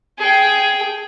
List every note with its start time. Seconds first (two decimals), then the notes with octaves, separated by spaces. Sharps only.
0.18 G#4 G5